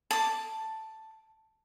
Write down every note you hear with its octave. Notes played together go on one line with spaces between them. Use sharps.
A5 D6